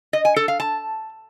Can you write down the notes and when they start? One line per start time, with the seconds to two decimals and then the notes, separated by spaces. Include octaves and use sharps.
0.13 D#5
0.25 G#5
0.36 A4
0.48 F5
0.60 A5